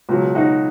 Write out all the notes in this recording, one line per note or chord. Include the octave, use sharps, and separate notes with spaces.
C#2 B2 F#3
D#4 F#4